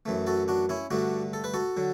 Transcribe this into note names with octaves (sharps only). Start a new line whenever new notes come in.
F#2 E3 A3
F#4 A4
D4 F#4
C#4 E4
G2 D3 A3 D4 F#4
A4
B4
F#4 A4
D3 F#3